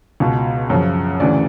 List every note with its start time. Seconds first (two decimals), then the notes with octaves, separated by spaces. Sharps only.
0.20 C#2 B2
0.70 F#2 C#3 F3
1.20 D2 C#3 E3 D5